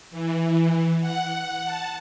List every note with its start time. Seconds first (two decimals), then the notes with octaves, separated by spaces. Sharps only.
0.11 E3
1.00 F#5
1.65 A5